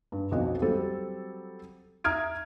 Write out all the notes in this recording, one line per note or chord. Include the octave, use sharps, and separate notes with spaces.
G2
B1 F2 F#4 D#5
F#3 G3 C4 A4
E5 A#5 D#6 F6 G#6 D7